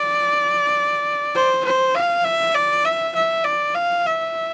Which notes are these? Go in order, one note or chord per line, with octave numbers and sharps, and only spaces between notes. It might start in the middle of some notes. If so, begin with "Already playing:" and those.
Already playing: D5
C5
C5
F5
E5
D5
E5
E5
D5
F5
E5